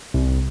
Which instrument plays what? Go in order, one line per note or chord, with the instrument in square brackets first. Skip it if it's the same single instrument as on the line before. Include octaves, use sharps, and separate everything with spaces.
[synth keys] C2